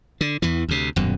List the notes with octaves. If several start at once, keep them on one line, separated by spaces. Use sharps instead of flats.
D3
E2 E3
D2 C3
D#1 F#2 B2